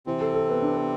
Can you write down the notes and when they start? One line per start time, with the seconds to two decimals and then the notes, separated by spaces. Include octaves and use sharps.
0.06 C3 E3 C4
0.21 A4
0.34 A4
0.49 B3
0.62 D4
0.76 B3